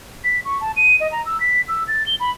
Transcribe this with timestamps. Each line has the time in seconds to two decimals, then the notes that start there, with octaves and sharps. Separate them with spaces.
0.24 B6
0.45 C#6
0.61 A5
0.77 D#7
1.00 D#5
1.12 A#5
1.26 E6
1.40 B6
1.68 E6
1.88 A6
2.07 G7
2.20 B5